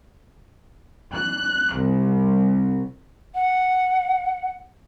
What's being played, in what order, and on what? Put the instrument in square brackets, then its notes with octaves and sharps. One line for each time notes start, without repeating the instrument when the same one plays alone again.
[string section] F#6
C2
[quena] F#5